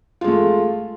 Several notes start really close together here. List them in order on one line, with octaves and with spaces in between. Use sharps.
F4 G#3 A3